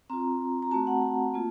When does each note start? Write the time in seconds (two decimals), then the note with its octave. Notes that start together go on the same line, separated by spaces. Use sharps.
0.10 C4 F4 A#5
0.62 A#5
0.71 A3 C4 F#4 A5
0.87 F#5
1.02 A5
1.34 A#3 F4